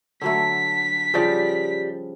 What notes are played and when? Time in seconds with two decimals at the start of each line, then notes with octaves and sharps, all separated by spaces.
0.21 D3 F#3 A3 B6
1.14 C#3 F3 G3 G4 D5